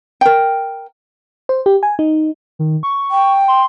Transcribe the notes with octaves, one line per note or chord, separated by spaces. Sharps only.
A#4 G5
C5
G4
G#5
D#4
D#3
C#6
G5
C6